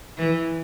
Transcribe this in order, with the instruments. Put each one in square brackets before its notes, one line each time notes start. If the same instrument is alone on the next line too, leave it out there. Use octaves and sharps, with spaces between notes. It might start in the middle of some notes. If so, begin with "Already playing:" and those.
[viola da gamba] E3